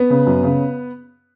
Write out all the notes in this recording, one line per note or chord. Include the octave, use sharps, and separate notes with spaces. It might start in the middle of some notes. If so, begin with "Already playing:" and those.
Already playing: B3 B4
C#3
F#2
C#3